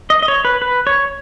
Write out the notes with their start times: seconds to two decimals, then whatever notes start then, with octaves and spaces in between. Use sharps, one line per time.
0.10 D#5
0.22 D#5
0.28 C#5
0.45 B4
0.62 B4
0.87 C#5